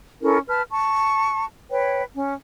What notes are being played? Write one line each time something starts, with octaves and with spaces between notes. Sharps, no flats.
C#4 E4 A4 A#4
B4 A5 F6
A5 C#6
B4 C#5 G5
C#4